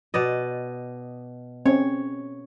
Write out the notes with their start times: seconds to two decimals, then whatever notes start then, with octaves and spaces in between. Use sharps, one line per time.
0.14 B2 D5 D#5
1.66 C4 C#4 C#5